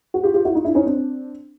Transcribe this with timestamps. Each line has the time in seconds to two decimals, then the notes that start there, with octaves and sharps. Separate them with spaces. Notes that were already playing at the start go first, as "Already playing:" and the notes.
0.14 F#4
0.23 F4 G4
0.34 F4 G4
0.45 E4 F#4
0.55 D#4 F4
0.65 D4 E4
0.75 C#4 D#4
0.86 C4 D4